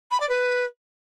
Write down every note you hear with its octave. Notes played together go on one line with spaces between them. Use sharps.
B5
D5
B4